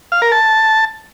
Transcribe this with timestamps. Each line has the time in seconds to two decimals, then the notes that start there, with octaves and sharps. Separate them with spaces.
0.12 F5
0.22 A#4
0.32 A5